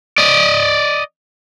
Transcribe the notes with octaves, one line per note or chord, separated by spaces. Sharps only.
D5 D#5